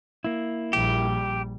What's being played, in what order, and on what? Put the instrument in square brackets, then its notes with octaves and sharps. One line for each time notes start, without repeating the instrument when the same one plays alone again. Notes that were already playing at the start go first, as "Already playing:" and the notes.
[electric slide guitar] A#3 E4
[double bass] A#1 G3 [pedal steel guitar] G4